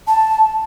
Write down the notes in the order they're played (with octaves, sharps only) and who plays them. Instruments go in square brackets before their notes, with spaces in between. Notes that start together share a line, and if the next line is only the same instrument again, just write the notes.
[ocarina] A5